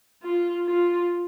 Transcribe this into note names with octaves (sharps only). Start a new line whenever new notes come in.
F4
F4